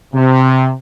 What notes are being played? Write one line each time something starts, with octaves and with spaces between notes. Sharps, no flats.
C3